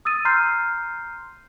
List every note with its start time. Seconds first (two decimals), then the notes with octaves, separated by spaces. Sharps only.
0.05 D#6 E6 A6 D#7
0.25 A#5 C6 F6 G6 C7